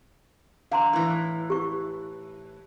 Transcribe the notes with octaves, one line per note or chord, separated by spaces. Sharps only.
D3 F5 A#5 C6
A2 E3
G4 C#6